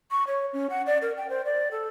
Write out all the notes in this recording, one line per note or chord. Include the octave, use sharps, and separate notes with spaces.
C#6
C#5
C#4
F#5
D5
A#4
G5
C5
D5
A4